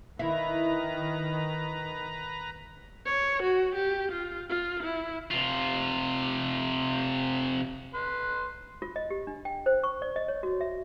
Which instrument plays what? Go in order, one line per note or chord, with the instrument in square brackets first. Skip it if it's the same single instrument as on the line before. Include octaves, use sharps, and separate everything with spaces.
[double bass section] D#3 [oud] E4 [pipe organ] B4 A#5
[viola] C#5
F#4
G4
F4
F4
E4
[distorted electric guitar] C3 F4
[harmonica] B4 C6
[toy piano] F4
D#5
G4
D4
G5
C5
C#6
D5
D#5
C#5
F#4
E5